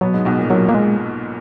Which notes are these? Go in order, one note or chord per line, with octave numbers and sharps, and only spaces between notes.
B2 F#3 B3
G#2 G#3
B1 B2
A#2
A#2 F#3
A#3
G#3